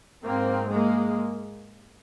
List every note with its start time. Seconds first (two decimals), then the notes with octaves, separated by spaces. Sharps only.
0.22 G#2 A#3 C4
0.70 G#3 A#3